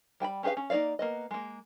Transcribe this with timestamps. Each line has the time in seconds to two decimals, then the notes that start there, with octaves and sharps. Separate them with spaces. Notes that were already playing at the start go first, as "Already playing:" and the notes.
0.20 G3 G5 G#5 B5
0.43 C#4 G4 G#4 B4 F5
0.57 C#4
0.70 A#3 D#4 C#5 D5 F5
0.99 A#3 B3 D#5
1.31 G#3 A#3